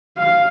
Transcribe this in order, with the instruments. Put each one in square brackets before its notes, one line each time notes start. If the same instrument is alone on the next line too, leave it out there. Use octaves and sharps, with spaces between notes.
[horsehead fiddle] F5